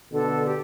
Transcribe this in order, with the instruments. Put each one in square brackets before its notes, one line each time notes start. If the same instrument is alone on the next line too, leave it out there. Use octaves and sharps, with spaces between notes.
[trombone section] B2 D3 [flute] A4
[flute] G4